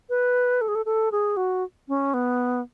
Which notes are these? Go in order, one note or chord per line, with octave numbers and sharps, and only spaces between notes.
B4
A4
G#4
A4
A4
G#4
F#4
C#4
B3